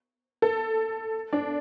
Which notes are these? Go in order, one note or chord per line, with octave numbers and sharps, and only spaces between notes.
A4
D4